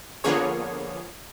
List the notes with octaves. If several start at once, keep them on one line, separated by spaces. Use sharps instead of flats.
D3 F3 A#3 B3 G#4 C#5